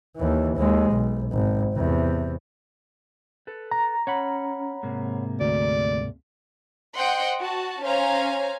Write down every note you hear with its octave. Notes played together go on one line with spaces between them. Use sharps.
D#2 E3
D#2 G#3
B1
G#1
E2 C3
A4 B4
A#5
C#4 C#5 F#5 B5
G#2 C3 A#3
D2 D5
C5 D#5 F#5 G5 C6
F#4 A5
C#4 C5 C#5 F5 G#5 A#5